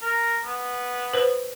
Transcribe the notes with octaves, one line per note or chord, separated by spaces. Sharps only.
A#4
B3
B4 C5